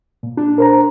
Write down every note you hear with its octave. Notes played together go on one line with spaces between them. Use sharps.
A#2
D4
A#4 C5 A#5